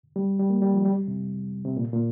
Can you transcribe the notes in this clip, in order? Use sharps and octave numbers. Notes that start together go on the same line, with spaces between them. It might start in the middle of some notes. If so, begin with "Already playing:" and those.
G3
G3
A#3
G3
F3
G3
C3
C3
A#2
A#2